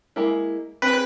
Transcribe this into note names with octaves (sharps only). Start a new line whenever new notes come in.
G#3 A#3 E4
C4 G#4 B4